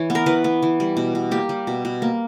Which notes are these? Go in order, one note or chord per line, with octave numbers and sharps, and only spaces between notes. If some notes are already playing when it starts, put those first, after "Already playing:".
Already playing: E3 C#5
B3
A#4
E3 B4
B3
E3
G3
B2
B2
A#3 G4
G3
B2
B2
A#3